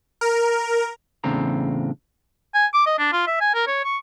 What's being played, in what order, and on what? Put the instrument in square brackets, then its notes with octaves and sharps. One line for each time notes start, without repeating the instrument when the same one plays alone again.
[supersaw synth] A#4
[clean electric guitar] E2 A2 C#3 C4 D4 A#5
[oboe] G#5
D6
D#5
D4
F4
E5
G#5
A#4
C#5
C#6